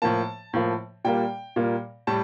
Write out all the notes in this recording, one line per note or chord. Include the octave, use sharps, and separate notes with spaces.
A2 F3 A#3 A5
A2 F3 A#3
A#2 G3 A#3 G5
A#2 G3 A#3
A2 G3 A5